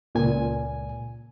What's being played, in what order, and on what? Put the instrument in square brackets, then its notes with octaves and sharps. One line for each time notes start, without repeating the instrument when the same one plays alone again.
[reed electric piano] C#2 A#2 G#5